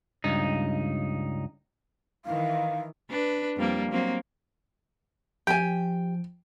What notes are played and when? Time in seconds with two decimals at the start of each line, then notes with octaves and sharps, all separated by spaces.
0.24 C#2 G2 D#4
2.25 D#3 E3 F5
3.10 D4 B4
3.57 F2 G3 A#3
3.92 F#3 A#3 C4
5.47 F3 G4 G5 G#5